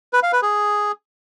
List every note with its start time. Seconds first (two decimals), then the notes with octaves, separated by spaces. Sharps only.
0.13 B4
0.23 F5
0.33 B4
0.42 G#4